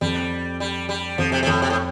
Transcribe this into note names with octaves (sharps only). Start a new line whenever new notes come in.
F2 G3
G3
G3
F2 F3
C3
C3
F2 A2
C3
A2